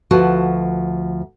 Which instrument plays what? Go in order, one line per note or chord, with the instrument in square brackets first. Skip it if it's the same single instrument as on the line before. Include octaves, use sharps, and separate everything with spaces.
[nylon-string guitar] D2 F3 F#4 B4 A5